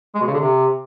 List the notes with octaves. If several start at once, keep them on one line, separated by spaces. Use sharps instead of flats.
G#3
B2
C#3
D3
C3